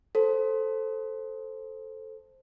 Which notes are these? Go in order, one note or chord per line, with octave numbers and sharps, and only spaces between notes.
A4 C5